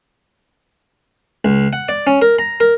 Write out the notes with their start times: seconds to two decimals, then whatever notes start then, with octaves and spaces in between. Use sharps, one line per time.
1.45 C#2
1.73 F#5
1.89 D5
2.07 C#4
2.22 A#4
2.39 A#5
2.60 A#4